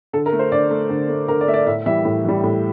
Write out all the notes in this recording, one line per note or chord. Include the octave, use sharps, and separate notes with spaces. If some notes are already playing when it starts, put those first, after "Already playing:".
D3 A4
A#4
A3
C5
D3 D5
A3
D3
A3
D3 A#4
D5
A3 E5
D5
A2 E5
E3 G3 E5
A2
E3 G3
A2